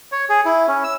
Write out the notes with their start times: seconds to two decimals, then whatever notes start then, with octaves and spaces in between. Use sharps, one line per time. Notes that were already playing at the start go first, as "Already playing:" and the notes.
0.12 C#5
0.29 G#4
0.45 E4
0.68 C#4
0.84 E6